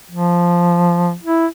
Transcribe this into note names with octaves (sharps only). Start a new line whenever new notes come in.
F3
E4